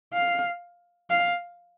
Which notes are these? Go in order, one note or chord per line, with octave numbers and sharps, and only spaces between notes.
F5
F5